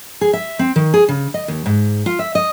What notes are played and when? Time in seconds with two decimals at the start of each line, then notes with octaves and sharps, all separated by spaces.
0.21 G#4
0.33 E5
0.59 C4
0.76 D#3
0.94 G#4
1.08 C#3
1.34 D#5
1.48 D#2
1.66 G#2
2.06 F4
2.19 E5
2.35 D#5